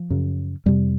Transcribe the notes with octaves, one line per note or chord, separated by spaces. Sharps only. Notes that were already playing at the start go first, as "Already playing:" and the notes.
Already playing: F3
F#2 C#3
F2 C3 G3